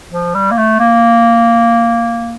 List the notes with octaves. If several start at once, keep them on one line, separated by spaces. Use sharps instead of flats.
F3
G3
A#3
A3
A#3